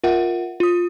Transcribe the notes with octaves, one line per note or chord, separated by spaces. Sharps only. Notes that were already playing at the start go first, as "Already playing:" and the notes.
F4 A#4 E5 F#5
F4 D#6